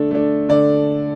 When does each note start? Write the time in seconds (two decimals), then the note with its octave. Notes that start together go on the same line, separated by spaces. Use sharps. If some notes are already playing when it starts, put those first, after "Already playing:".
Already playing: D3 A3 D4 A4
0.11 A3 D4
0.49 D3 D5